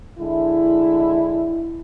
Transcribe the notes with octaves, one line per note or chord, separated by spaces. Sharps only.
D3 G#3 E4